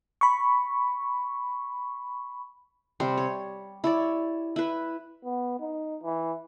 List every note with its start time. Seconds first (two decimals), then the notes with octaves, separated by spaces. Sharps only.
0.21 B5 C#6
3.00 C3 G3 C5
3.17 C#5
3.84 E4 C#5 D5
4.56 E4 B4
5.24 B3
5.60 D#4
6.03 E3